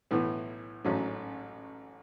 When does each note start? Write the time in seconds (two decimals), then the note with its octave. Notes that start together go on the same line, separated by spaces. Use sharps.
0.11 B1 A2 E3 B3
0.84 A1 G#2 F#3 A3 C#4